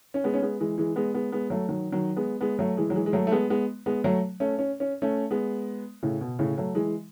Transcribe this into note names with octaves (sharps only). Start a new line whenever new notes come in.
C#4
G#3 B3
C#4
G#3 B3
E3 G#3
E3 G#3
G#3 B3
G#3 B3
G#3 B3
F#3 A3
D#3 F#3
D#3 F#3
G#3 B3
G#3 B3
F#3 A3
E3 G#3
F#3
E3 G#3
G#3
F#3 A3
A3
G#3 B3
G#3 B3
G#3 B3
F#3 A3
A3 C#4
C#4
C#4
A3 C#4
G#3 B3
A2 C#3
B2
A2 C#3
F#3 A3
E3 G#3